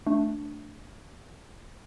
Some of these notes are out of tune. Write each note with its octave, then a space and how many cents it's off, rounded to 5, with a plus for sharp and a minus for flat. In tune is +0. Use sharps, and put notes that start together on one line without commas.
A3 +5 D4 +0